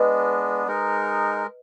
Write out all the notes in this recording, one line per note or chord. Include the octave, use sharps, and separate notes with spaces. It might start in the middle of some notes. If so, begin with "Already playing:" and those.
Already playing: G#3 B3 D4 B4 D#5
G#3 D#4 A#4